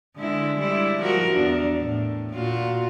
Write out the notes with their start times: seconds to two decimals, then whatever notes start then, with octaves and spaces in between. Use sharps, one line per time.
0.16 D3 G#3 E4
0.57 G3 G#3 E4
0.99 F3 F#4 A#4
1.33 E2 D4
1.78 A2
2.33 A#2 F4 F#4